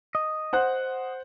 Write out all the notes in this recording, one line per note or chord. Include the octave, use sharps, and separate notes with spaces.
D#5
C5 F#5 F#6